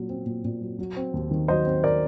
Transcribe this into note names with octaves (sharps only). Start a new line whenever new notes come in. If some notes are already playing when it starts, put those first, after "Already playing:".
Already playing: A#2 F#3
C4
A#2
A#2
F#3
F#3
C4
D#2
D#3
F#3 C5 D#5
C4
A#4 D5